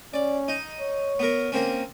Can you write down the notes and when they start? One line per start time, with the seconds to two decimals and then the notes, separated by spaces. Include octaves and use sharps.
0.14 C#4 D5
0.48 D#4
0.80 C#5
1.19 B3 A#4
1.52 A#3 C4 C#4